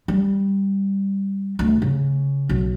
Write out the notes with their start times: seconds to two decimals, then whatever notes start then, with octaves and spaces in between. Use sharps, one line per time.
0.08 G3
1.59 D2
1.82 C#3
2.49 B1